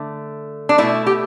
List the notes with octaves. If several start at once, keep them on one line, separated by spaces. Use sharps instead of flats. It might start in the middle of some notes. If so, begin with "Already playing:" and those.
Already playing: D3 A3
D4
B2 A3 E4
G4